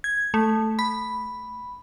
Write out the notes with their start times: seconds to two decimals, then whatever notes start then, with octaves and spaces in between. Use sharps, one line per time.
0.04 G#6
0.34 A3
0.79 B5